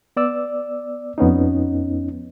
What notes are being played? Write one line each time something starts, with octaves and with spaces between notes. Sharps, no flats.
B3 D5 E6
F2 B3 C#4 D#4